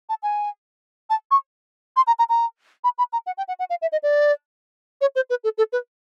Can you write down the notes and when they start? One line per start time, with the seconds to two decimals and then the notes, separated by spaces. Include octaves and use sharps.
0.09 A5
0.23 G#5
1.10 A5
1.31 C#6
1.97 C6
2.07 A#5
2.19 A#5
2.29 A#5
2.84 B5
2.98 B5
3.13 A#5
3.26 F#5
3.38 G5
3.48 F#5
3.59 F#5
3.70 F5
3.82 E5
3.92 D#5
4.03 D5
5.01 C#5
5.16 C5
5.30 B4
5.44 A4
5.58 A4
5.73 B4